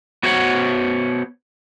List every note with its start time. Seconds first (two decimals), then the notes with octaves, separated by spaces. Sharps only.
0.23 B3 F#4 C5 C#5 F#5